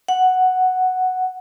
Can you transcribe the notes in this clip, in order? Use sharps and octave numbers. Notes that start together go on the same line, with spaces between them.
F#5